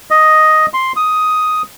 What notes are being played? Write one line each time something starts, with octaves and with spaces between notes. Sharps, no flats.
D#5
C6
D#6